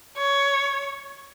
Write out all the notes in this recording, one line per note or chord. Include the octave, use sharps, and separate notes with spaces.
C#5